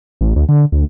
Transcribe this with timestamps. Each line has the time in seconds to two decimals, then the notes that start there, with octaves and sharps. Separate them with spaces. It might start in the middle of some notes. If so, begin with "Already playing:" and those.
0.21 A1
0.36 D2
0.49 D3
0.72 D2